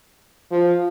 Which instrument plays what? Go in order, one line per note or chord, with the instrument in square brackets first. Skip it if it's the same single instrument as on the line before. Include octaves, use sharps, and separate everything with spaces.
[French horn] F3